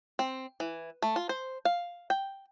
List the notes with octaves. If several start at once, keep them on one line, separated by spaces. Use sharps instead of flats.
C4
E3
A3
F4
C5
F5
G5